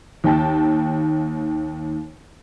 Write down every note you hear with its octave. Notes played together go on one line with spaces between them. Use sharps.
D#2 G5 A5